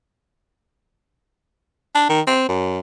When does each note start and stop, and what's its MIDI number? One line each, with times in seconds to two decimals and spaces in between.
1.95 2.04 62
2.09 2.21 51
2.27 2.47 60
2.49 2.80 42